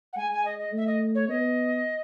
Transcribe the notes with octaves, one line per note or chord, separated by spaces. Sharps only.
F#5
G#3 G#5
G#5
D#5
D#5
A3 E5
D#5
C#5
B3 D#5